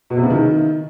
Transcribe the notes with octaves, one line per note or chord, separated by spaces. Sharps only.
B2
C3
C#3
D#3